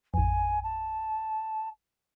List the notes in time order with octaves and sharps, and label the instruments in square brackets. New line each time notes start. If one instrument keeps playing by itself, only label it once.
[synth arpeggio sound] A1 F2 [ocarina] G#5
[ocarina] A5